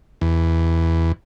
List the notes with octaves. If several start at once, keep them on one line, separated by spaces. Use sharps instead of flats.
E2